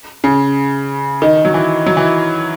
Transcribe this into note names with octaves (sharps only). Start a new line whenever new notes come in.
C#3
D#3
F#3
E3
F#3
E3